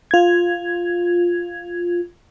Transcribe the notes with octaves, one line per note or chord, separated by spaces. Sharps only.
F4 G#6